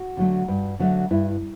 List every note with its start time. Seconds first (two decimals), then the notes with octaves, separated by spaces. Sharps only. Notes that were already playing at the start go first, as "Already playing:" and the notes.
Already playing: F#4
0.17 D3 F#3 A3
0.48 G2
0.79 D3 F#3 A3
1.11 G2 E4